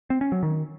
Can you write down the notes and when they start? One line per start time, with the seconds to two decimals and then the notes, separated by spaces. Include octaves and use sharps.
0.10 C4
0.21 C#4
0.32 F#3
0.43 D#3